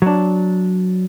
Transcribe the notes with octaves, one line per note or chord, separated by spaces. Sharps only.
F#3 D4